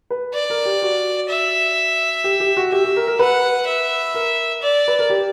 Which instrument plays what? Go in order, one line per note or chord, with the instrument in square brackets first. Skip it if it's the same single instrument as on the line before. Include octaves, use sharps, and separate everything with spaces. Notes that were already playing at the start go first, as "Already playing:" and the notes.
[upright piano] B4
[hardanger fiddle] D5
[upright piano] A#4
G4
F#4
[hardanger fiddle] E5
[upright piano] G4
G4
F#4
[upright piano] G4 [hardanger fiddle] E5
[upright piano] G4
A#4
A#4
[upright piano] B4 [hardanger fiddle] F#5
[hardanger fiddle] E5
[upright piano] A#4
[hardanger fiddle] D5
[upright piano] B4
A#4
G4